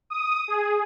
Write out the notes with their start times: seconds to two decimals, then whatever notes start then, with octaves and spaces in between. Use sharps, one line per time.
0.10 D#6
0.48 G#4